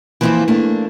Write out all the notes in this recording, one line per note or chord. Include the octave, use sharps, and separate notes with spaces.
E3 F3 A#3 C4 E4 F4
A3 A#3 D4